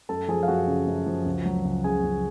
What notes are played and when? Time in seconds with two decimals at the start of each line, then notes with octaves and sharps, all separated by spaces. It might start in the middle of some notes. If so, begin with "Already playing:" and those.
0.09 F#2 A4 A5
0.28 F3 G#4 G#5
0.43 F5
0.48 F#2 F#4 F#5
0.67 C#3
0.87 F#2
1.06 F3
1.26 C#2
1.45 F#3
1.65 C#2
1.84 C#3 G#4 G#5
2.04 C#2